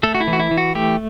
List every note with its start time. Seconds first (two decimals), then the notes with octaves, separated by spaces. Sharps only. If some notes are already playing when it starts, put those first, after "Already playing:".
0.03 A3 A4
0.15 F#4
0.21 E4
0.27 E3
0.33 F#4
0.40 E4
0.51 E3
0.57 F#4
0.75 A3 G4